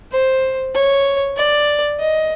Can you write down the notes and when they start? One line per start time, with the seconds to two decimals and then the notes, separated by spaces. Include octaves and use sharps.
0.12 C5
0.75 C#5
1.37 D5
2.00 D#5